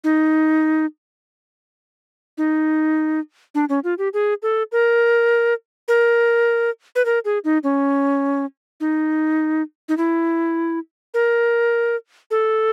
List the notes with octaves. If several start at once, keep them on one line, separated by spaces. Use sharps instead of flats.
D#4
D#4
D4
C#4
F4
G4
G#4
A4
A#4
A#4
B4
A#4
G#4
D#4
C#4
D#4
D#4
E4
A#4
A4